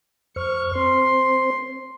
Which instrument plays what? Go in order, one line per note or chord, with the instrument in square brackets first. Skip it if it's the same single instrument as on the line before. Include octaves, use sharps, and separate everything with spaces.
[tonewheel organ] F2 C5 F6 [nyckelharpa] C#6
[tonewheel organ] C4 C5 [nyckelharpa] C6